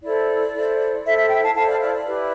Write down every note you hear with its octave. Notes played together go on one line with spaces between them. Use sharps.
E4 A4 C5 D5
E4 A4 C5
E4 A4 C5 E5
E5
E5 G5
F5 A5
E4 A4 C5 F5 A5
D5 F5
D5 F5
D5
E4 G4 B4